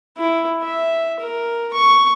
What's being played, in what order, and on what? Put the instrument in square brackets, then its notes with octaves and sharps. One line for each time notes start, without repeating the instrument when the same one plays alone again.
[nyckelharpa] E4
E5
A#4
C#6